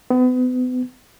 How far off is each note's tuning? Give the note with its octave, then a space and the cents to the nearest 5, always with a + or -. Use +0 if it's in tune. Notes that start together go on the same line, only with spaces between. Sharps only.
B3 +35